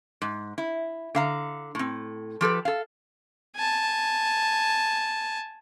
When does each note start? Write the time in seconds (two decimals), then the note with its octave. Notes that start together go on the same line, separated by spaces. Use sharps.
0.22 G#2
0.58 E4
1.15 D3 F5 A#5
1.75 A2 C4
2.41 F3 G4 A4 B4
2.65 A4 F5
3.56 G#5 A5